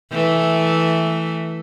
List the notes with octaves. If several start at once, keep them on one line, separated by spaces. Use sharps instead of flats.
E3 A3